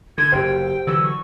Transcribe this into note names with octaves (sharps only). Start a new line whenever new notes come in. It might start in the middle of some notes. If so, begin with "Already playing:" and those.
D3 G#6
F#1 G4 C5 G5
D3 E3 F#3 E6
C#6